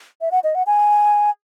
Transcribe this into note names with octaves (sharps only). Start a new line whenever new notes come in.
E5
F#5
D#5
F#5
G#5